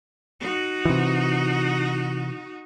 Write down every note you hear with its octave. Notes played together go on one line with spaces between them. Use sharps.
D#4 F#4
C3 E3